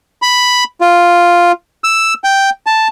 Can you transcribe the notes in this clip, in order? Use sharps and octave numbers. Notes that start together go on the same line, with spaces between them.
B5
F4
E6
G5
A5